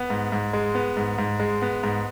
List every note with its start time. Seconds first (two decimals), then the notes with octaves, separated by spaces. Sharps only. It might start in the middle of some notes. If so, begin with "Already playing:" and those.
Already playing: B3
0.10 G#2
0.32 G#2
0.53 G#3
0.75 B3
0.97 G#2
1.18 G#2
1.40 G#3
1.62 B3
1.83 G#2